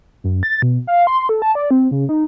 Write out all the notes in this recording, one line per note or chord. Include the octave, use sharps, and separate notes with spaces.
F#2
A6
B2
F5
C6
A4
A5
D5
C4
C#3
D#4